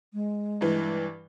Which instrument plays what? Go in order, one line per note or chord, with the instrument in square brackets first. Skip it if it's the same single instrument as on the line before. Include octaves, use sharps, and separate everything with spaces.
[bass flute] G#3
[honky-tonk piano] G2 E3